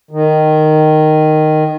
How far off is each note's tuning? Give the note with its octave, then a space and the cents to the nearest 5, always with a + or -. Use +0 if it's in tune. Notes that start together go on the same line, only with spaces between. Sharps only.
D#3 -10